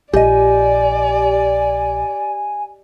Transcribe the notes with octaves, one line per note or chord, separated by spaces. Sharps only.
A#1 G4 D5 D#5 G#5